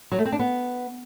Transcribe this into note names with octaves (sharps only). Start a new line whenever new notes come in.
F#3
A3
C4
D4
B3